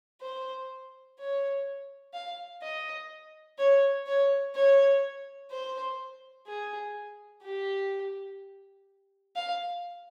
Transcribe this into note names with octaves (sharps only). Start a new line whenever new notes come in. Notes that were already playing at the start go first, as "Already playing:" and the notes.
C5
C#5
F5
D#5
C#5
C#5
C#5
C5
G#4
G4
F5